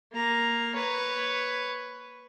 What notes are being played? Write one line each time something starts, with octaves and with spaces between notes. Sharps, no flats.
A#3 A#5
B4 C#5